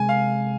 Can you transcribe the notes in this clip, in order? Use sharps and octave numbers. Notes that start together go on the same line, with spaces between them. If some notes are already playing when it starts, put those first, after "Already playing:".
Already playing: C3 G#3 G#5
F5